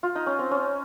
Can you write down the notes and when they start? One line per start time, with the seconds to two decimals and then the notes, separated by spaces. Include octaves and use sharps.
0.03 F4
0.15 D#4
0.26 C#4
0.39 C4
0.51 C#4